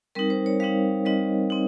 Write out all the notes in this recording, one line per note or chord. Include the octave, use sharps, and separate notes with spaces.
G3 C4 D#4 A#4
C5
C#5
G3 C4 D#4 F5
G3 C4 D#4 D#5
C4 D#4